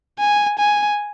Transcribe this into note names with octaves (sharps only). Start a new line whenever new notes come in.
G#5
G#5